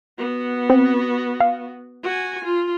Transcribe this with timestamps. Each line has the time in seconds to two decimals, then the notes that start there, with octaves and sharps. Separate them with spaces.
0.18 B3 F#4
0.70 C4
1.40 F5
2.03 F#4 G#5
2.44 F4